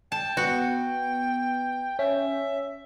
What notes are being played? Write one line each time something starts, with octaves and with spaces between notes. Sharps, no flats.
G5 A5
B3 F#4
C#4 E5